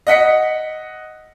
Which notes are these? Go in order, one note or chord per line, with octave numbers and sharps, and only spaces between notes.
D#5 F#5 B6 C#7